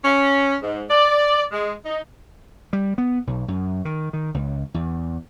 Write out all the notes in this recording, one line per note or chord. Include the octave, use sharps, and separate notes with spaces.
C#4
G#2
D5
G#3
D#4
G3
B3
B1
F#2
D#3
D#3
C#2
E2